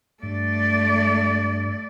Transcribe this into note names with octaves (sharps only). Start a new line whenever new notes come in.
G2 A3 D5